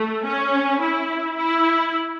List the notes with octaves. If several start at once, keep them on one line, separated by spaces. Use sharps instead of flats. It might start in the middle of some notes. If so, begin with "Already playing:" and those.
Already playing: A3
C#4
E4
E4